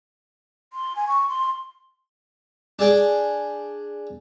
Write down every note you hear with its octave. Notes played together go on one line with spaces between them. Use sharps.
C6
G#5
C#6
C6
D4 G#4 G5 D6